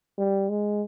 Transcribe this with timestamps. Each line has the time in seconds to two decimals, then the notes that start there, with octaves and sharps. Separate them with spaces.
0.18 G3
0.49 G#3